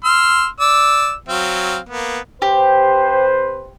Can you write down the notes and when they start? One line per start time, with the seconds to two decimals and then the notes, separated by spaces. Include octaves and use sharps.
0.04 C6 E6 F6
0.60 D5 E6
1.28 F#3 C4 F5
1.89 A#3 B3
2.42 C3 G4 B4 C5